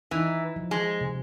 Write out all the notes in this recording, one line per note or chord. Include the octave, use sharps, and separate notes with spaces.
E3 D#4
F3
G#3
C3